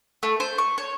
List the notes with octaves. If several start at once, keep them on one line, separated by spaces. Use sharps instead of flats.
A3
C5
C#6
C#5